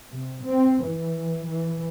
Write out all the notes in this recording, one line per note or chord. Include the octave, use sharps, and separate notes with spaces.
C3
C4
E3
E3